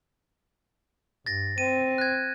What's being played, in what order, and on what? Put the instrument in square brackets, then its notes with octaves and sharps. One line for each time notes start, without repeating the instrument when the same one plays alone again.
[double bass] G2 [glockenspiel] A6 A#6
[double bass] C4 [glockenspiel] D#7
[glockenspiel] F#6 G#6